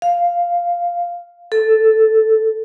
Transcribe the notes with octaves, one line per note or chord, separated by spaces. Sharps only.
F5
A4